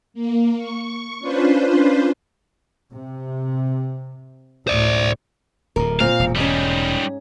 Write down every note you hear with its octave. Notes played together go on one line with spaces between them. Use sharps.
A#3
C#6
C#4 D4 F4 B4 C5
C3
D2 A2 C5 D5
D1 A2 A#4
A#2 C4 F5
E1
G#2 G3 C#4 D#4